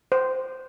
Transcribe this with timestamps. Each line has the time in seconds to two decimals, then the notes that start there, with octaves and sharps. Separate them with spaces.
0.12 C5